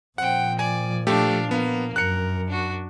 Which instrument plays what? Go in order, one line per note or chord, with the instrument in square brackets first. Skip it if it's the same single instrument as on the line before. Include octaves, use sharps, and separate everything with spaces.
[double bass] A#2 F3 [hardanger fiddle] C4 G5 [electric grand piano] F#5
[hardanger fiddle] D5 [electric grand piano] G#5
[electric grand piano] A3 G4 [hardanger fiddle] D4 F5
[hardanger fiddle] A#3 [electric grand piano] B3
[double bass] F#2 [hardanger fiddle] A#4 [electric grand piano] F#6 C#7
[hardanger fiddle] D4 F#4